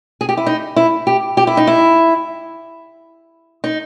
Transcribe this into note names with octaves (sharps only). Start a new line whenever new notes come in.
G#4
G4
E4
D#4
E4
G4
G4
E4
D#4
E4
D#4